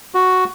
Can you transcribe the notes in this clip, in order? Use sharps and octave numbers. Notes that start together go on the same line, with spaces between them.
F#4